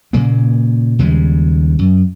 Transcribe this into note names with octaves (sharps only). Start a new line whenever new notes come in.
A#2 C#3 A#3
D#2 C#3 G3 G#3
F#2